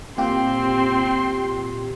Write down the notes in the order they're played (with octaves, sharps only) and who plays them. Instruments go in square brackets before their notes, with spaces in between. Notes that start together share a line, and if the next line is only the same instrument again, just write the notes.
[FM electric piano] A#2 F4 G4 [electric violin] C4 C6